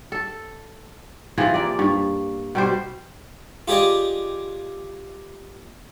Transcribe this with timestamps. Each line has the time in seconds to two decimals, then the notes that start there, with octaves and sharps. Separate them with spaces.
0.12 A4
1.38 C3 E3 F3 G#4
1.54 A#3 D5
1.79 G2
2.55 B2 G3 C5
3.68 F4 G4 G#4 D5 D#5